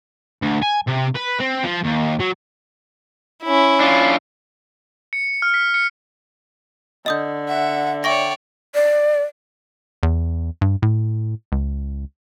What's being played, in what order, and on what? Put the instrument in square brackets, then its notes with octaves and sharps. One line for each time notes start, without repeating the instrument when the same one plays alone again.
[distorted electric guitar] D2
G#5
C3
B4
C4
F3
D#2
F#3
[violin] C#4 E4
[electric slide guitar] D4 F4
[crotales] C#7
F6
B6
C#7
[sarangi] D3 [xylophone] D#5 D#6 G6
[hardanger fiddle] E5 [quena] F#5
[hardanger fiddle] C#5 D5 [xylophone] E5 C#6 A#6 [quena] G5
[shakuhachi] D5
[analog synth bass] E2
G2
A2
C#2